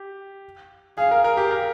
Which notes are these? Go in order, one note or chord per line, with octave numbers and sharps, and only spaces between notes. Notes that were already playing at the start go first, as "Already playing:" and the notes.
Already playing: G4
G#4 F5
A#4
A#4
G4
A#4